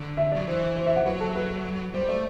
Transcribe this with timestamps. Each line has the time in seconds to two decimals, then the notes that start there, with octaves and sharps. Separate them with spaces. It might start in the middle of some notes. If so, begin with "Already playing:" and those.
Already playing: D3
0.17 E5
0.32 D5
0.35 F#3
0.47 E3 C5
0.76 C5
0.86 E5
0.96 F#5
1.06 F#3 B4
1.20 A4
1.36 B4
1.94 G3 C5
2.09 A3 D5